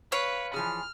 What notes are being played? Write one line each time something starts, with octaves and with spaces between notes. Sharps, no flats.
B4 C#5 F5
E3 F3 G#4 F6